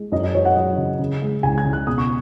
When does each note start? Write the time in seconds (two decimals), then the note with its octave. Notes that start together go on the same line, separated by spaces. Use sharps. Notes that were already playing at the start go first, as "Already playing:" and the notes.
Already playing: G#3
0.12 F#2 D#5
0.23 D#5
0.34 F#3 C#5
0.45 F#5
0.56 F#3 D#5
0.77 C#3
0.99 C#3
1.22 G#3
1.43 C#2 G#5
1.58 G#6
1.65 C#3
1.73 F#6
1.87 B2 D#6
1.98 C#6